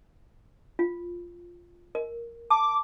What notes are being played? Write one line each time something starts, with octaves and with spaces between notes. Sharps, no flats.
F4
A#4
A5 D6